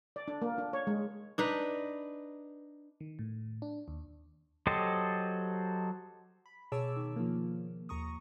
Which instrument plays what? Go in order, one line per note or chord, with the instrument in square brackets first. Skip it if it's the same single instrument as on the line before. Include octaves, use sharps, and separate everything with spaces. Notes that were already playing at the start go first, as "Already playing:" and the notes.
[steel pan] D5
D4
A#3
D4
C#5
G#3
[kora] D4 D#4 B4
[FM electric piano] D#3
A2
D4
D#2
[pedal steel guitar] F#3 G4 A4 C5 D#5
[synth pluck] B5
B2 G#4 C#5 A5 D6 E6
D#3
F3 A#3
D#2 A#5 C#6 D#6